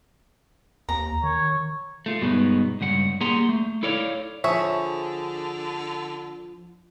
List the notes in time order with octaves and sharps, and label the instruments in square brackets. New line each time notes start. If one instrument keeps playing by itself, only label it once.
[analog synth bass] D#2 [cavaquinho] A#5
[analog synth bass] D#3 [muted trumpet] C#5
[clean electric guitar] A3 F4
G2 B2 G#3 B3 D#4
C#2 G2 F#5
G3 A#3 G#4 F#5 A#5 C6
A3
E4 A4 C#5 D5 F5
[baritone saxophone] D3 [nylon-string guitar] F3 [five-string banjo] G#4 C#5 E5